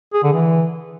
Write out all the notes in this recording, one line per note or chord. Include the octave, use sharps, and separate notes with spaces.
G#4
D3
E3